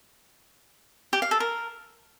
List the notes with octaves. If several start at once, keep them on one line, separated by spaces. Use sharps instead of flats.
G4
F5
A4
A#4